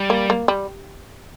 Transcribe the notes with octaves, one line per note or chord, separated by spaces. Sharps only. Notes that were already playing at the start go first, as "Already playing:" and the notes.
Already playing: G3
A#3
A#3
G3